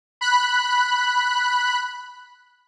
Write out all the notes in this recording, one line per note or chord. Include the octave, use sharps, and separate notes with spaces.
B5 F#6